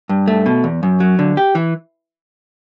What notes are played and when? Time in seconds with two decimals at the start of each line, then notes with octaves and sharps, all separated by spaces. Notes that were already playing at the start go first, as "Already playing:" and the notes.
0.09 G2
0.28 A3
0.46 B2
0.64 E2
0.83 F#2
1.00 F#3
1.19 D3
1.37 G4
1.55 E3